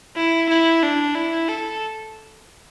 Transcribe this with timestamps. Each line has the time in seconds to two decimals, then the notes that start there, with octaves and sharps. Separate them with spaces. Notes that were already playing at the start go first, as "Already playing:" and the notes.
0.16 E4
0.49 E4
0.83 D4
1.15 E4
1.48 A4